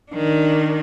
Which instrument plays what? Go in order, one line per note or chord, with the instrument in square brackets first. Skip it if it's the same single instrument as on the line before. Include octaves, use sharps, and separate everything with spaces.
[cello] D#3 D4